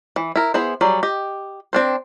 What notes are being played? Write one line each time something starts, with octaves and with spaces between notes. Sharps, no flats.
E3
E4 A#4
B3 E4 G#4 C5
F#3 G3 G#4
G4 D#5
C4 D4 C5